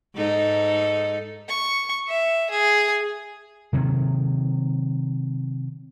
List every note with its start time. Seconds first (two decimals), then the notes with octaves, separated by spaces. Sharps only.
0.15 G#2 D#4 A4
1.48 C#6
2.09 E5
2.50 G#4
3.73 C3 D#3 F#3